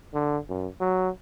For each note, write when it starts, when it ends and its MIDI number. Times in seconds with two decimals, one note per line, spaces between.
0.14 0.38 50
0.49 0.68 42
0.80 1.10 54